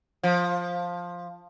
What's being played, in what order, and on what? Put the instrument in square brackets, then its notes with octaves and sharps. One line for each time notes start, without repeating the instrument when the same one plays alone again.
[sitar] F3